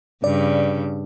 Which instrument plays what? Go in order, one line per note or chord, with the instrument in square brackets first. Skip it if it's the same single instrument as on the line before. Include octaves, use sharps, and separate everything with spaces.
[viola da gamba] G2 C#3 [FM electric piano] D5